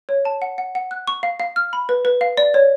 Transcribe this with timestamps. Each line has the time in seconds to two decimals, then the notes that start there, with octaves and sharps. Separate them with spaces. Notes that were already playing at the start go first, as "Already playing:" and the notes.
0.09 C#5
0.25 A5
0.42 F#5
0.58 F#5
0.75 F#5
0.91 F#6
1.07 C#6
1.23 F5
1.40 F5
1.56 F6
1.73 B5
1.89 B4
2.05 B4
2.21 F5
2.37 D5
2.54 C#5